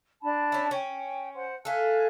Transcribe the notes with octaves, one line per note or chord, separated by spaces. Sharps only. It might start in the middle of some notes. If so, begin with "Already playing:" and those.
D4 A5 B5
C#4 E4
C#4 G5
C5 F#5 C6
A3 A4 F5 G#5 F#6